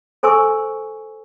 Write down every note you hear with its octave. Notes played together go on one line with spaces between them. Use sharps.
A4 C5 G#5 C#6 E6